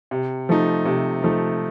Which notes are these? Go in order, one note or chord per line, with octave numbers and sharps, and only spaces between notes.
C3
F3 A3 D#4
C3
F3 A3 D#4